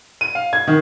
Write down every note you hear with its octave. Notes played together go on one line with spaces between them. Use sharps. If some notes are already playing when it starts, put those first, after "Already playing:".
D#7
F5
G#6
D#3